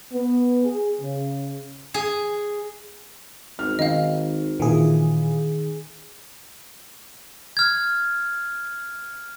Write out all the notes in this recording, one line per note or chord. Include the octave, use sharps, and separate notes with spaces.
B3
G#4
C#3
G#4
G#1 F6
D#3 D#5 F5
A#2 D#3 E3 G#4
F6 G#6